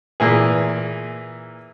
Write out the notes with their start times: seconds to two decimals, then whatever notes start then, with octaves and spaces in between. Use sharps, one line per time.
0.20 A#2 E3 G#4